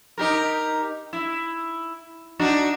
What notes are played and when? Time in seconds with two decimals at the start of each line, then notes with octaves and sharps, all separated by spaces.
0.18 D#4 G4 A#4
1.13 E4
2.39 D4 D#4 F#4